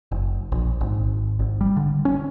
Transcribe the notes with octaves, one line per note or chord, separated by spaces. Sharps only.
F#1
A#1
G#1
G#1
G3
D3
C#4